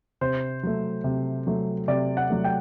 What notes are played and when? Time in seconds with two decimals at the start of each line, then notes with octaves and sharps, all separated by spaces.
0.21 C3 C5
0.63 F#3 A3
1.04 C3
1.47 F#3 A3
1.88 C3 D5
2.17 F#5
2.30 F#3 A3
2.44 G5